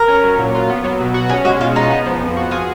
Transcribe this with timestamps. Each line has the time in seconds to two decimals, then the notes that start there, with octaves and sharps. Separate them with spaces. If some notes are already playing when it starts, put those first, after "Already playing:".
Already playing: A#4
0.08 C#4
0.24 F#3
0.38 A#2
0.55 F4
0.70 B3
0.84 F#3
1.00 B2
1.14 F#4
1.29 C#4 G#4
1.45 G#3 F#4
1.60 B2 F4
1.76 D#4 F4
1.90 B3
2.06 F3
2.21 F2
2.37 F#4
2.51 F4 G#4